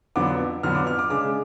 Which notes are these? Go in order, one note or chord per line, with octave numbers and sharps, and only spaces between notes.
F2 D3 F#3 B3 D4 D6
F2 D3 F#3 B3 D4 F6
D6
F6
D6
C#3 G#3 D4 D6